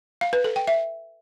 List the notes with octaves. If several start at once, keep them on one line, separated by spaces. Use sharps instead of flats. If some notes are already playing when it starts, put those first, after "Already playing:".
F5
B4
A4
G5
E5